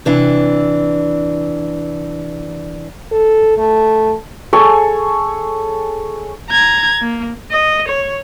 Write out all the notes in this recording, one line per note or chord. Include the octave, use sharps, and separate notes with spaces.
C3 E3 D4
A4
A3
G#4 A4 C#5 G#5
A#5 G#6
A#3
D#5
C#5